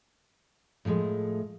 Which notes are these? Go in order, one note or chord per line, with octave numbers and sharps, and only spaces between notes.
A2 F3 F#3 G#3 A3